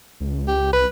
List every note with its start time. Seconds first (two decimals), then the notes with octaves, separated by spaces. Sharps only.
0.20 C#2
0.48 G4
0.73 C2 B4